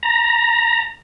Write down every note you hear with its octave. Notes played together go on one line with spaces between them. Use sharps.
A#5